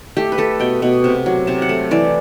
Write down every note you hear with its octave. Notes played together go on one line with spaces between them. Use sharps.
A3 G4
B4
A3 A4
B2 G5
B2
C3
F#3
C3 A5
F#5
A3
E3 D5